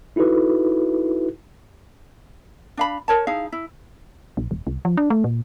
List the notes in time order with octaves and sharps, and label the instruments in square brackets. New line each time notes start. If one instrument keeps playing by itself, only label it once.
[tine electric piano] D#4 E4 F#4 A4 B4
[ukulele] D4 F5 B5
A#4 C#5 A5
D#4 E4 G#4 F5
E4
[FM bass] A#1
D#1
C2
F3
D4
A3
A#2